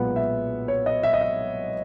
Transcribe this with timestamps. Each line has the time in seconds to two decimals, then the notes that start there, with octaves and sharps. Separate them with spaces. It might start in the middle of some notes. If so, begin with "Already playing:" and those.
Already playing: B1 A#2 G#3 B3 F#5
0.16 E5
0.68 C#5
0.86 D#5
1.03 E5
1.14 D#5
1.21 E5